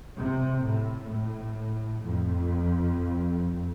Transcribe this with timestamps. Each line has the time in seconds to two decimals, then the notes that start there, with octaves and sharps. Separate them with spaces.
0.18 C3
0.65 A2
1.11 A2
2.04 F2